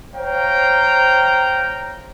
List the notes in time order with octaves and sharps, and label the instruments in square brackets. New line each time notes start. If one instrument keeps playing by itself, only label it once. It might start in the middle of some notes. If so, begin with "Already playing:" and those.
[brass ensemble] C5 C#5 F5 G5 A#5